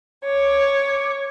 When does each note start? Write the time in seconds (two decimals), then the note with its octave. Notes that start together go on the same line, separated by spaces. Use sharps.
0.24 C#5 D6